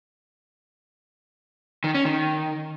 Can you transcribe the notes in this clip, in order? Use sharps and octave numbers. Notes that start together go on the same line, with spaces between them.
D#3
C#4
D#3